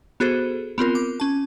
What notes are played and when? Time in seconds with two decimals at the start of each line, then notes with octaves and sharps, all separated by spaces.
0.20 B3 F#4 G#4 A4 C5
0.78 B3 C4 F4 A#4
0.95 D6
1.20 C#4 A5